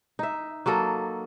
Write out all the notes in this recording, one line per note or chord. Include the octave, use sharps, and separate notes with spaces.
D#4 E5
F#3 A#3 A4 D#5